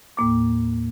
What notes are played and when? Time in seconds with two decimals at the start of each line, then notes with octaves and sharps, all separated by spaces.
0.17 D#2 A2 A#3 D6